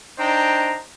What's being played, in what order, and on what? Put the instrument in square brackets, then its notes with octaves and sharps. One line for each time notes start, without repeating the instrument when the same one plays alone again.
[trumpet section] D4 D#4 C5 G5 A#5